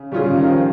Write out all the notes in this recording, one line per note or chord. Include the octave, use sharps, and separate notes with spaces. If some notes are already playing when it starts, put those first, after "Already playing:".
Already playing: C#3
C#3 G3 C#4 F4 G#4
C#3
D#3
F3